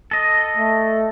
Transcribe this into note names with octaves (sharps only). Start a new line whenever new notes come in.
A4 D#5
A3